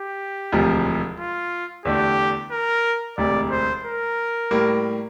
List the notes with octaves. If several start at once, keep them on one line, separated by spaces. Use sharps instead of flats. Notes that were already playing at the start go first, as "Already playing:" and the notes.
Already playing: G4
E1 D2 C3 F3
F4
E2 D3 A3 D4 G4
A#4
E1 D2 C3 D5
C5
A#4
A2 G3 A#3